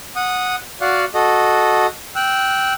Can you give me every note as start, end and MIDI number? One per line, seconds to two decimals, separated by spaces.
0.16 0.56 78
0.16 0.56 87
0.81 1.05 66
0.81 1.05 74
0.81 1.05 77
0.81 1.05 78
1.14 1.87 66
1.14 1.87 69
1.14 1.87 75
2.15 2.73 79
2.15 2.73 88
2.15 2.73 90